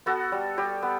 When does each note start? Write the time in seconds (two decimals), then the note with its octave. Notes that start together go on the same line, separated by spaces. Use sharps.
0.06 B3 F#4 A4
0.32 G3
0.58 G3 G4
0.82 B3